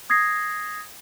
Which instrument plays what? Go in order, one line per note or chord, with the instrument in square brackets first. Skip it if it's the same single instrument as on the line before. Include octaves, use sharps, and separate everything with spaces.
[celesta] D#6 G#6 A#6 C7